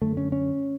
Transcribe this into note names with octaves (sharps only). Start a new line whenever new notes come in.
F#2 D3 A3
C#4
C#4